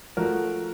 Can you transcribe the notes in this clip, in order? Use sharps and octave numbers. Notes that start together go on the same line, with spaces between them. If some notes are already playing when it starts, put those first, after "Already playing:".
F3 A3 F#4 A#4